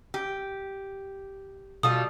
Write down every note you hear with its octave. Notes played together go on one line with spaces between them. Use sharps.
G4
B2 G3 F4 A4 D#6